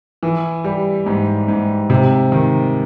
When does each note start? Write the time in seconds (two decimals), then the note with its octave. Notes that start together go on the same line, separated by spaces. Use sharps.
0.23 E3
0.64 G3
1.06 G#2
1.48 G#2
1.90 C3
2.32 D#3